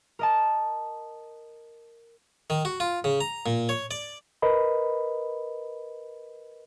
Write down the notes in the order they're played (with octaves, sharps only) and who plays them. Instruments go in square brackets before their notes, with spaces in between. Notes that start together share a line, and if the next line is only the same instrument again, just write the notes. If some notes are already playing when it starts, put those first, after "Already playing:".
[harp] A#4 D#5 A5
[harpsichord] D#3
F#4
F4
C#3
A#5
A#2
C#5
D5
[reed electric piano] A#4 B4 D#5 B5